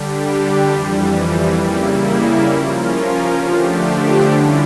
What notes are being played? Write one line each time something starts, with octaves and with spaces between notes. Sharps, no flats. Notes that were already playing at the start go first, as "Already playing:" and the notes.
Already playing: D3 G3 D4 G4
F2 E3 G3
C#3 G3 A#3 E4
F3 C#4 F4 A#4
D3 F3 A3 D4 G4
D3 G3 C#4 E4